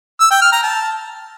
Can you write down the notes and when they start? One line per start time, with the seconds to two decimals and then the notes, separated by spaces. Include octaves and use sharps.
0.20 E6
0.31 G5
0.41 F6
0.52 A#5
0.63 A5